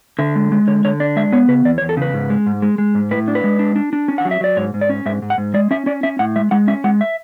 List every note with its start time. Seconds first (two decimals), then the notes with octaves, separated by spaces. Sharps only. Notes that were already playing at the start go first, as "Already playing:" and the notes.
0.19 D3 E5
0.36 G#3
0.52 G#3
0.67 D3 C#5
0.85 D3 C#5
1.00 D4 D5
1.16 G#3 E5
1.32 B3 C#5
1.48 C#3 B4
1.65 E2 D5
1.78 C#5
1.81 E2
1.89 A4
1.97 C#3 B4
2.14 G#2
2.30 G#3
2.46 G#2
2.62 G#3
2.78 G#3
2.95 G#2
3.11 A2 B4
3.28 D4
3.35 B4
3.44 G#3
3.59 D4
3.76 D4
3.93 D4
4.08 C#4
4.18 F#5
4.25 F#3
4.31 E5
4.41 F#3 D5
4.57 G#2 C#5
4.74 G#2
4.81 D5
4.89 C#4
5.06 G#2 E5
5.22 G#2
5.30 F#5
5.38 G#2
5.54 G#3 D5
5.71 C#4 E5
5.86 C#4 D5
6.03 C#4 E5
6.19 A2 F#5
6.36 G#3 E5
6.51 G#3 F#5
6.68 C#4 E5
6.84 G#3 F#5
7.01 E5